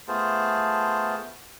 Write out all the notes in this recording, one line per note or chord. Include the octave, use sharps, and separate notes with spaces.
A3 B3 F4 G#4 C5 A5